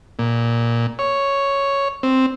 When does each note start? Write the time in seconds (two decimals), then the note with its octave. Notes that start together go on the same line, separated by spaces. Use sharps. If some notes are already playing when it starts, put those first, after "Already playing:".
0.19 A#2
0.99 C#5
2.03 C4